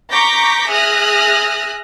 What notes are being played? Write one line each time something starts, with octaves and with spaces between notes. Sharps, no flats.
A#5 C#6 D6 G6 A#6 B6
G#4 E5 D#6 F6 F#6 A#6